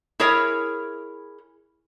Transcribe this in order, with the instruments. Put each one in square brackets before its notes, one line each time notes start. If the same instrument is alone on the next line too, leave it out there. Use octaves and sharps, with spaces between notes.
[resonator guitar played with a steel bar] E4 G#4 A#4 C#5